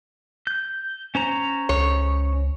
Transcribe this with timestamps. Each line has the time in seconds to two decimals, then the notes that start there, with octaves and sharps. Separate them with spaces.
0.47 G6
1.15 C#4 C5 A#5
1.69 C#2 C#5